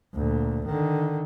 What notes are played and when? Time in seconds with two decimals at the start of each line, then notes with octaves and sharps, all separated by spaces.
0.14 D2 A#2
0.65 D3 D#3